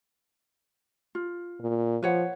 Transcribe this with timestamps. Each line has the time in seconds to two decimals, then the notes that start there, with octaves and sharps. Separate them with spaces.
1.15 F4
1.60 A#2
2.03 F3 B4 C#5 F#5